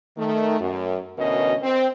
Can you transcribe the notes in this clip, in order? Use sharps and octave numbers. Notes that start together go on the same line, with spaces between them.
D#3 A3
F#2
D2 B2 E3 C#4 A#4 D#5
C4